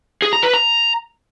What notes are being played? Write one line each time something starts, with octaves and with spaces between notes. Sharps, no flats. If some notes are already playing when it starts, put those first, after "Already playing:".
G#4
A#5
B4
A#5